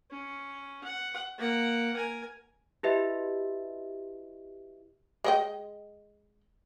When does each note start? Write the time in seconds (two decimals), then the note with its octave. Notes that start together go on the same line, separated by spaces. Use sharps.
0.11 C#4
0.84 F#5
1.38 A#3 F#5
1.96 A#4 G#5
2.83 E4 F#4 G4 B4 D#5 E5
5.24 G#3 D#5 G5